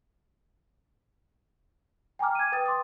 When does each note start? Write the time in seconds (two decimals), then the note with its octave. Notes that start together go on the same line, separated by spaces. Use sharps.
2.19 G5 G#5 A#5 D6 F6
2.35 G#6 D#7
2.52 B4 G5 D#6 A6
2.66 C6 D6 D#6